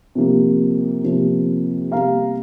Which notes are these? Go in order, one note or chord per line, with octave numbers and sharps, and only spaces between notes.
C3 F3 A#3
C3 F3 A#3
C3 G3 A#3 F5 A#5